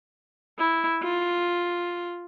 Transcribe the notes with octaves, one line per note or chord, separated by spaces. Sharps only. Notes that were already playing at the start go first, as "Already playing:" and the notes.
E4
F4